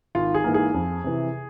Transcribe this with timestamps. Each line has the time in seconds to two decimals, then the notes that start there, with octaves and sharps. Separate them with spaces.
0.15 G#1 F4
0.34 G#4
0.44 G#2 E3 A#3
0.54 G#4
0.74 F2
1.04 C3 E3